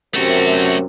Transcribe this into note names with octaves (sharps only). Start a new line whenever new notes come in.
F#2 C3 A3 F#4